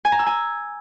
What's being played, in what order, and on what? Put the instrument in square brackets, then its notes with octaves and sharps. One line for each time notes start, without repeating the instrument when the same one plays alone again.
[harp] G#5
A#5
E6
G#5